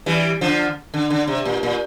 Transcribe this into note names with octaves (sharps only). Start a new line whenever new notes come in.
E3 G3
D3 F3
D3
D3
C3
A#2
A#2